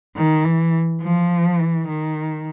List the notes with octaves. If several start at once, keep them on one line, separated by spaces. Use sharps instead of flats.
D#3
E3
F3
E3
D#3